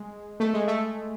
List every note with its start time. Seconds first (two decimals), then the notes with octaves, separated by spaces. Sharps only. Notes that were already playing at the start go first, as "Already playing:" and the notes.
Already playing: G#3
0.40 A3
0.54 G#3
0.67 A3